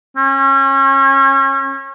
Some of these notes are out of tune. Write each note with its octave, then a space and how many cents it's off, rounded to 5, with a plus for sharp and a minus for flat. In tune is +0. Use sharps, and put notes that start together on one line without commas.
C#4 -30